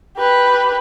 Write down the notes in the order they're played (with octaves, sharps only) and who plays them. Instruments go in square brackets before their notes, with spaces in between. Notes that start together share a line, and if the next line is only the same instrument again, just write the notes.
[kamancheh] G4 B4